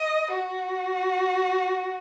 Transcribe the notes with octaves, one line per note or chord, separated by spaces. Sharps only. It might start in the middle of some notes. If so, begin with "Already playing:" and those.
Already playing: D#5
F#4